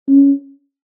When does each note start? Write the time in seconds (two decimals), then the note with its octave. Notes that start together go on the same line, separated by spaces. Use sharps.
0.09 C#4